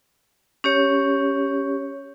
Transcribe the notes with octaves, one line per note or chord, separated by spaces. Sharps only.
C#4 G4 C#5